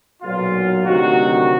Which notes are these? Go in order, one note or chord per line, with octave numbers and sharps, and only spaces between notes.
B1 A#2 F#3 F4
D2 C3 D#3 F#3 F#4